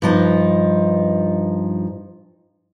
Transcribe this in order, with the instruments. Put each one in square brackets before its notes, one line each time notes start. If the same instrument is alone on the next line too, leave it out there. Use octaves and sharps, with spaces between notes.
[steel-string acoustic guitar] G2 F3 D#4